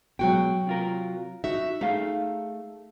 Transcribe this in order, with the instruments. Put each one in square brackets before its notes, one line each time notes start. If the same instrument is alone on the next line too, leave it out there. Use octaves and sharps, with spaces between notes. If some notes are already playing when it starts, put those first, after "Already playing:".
[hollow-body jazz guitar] B2 G#3 [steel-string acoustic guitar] F#3 F#4 G5
[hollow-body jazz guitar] C3 F4 A#4
[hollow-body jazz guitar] D#4 [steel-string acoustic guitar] F#4 E5
[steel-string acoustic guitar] A3 [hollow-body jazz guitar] D#4 G#4 F5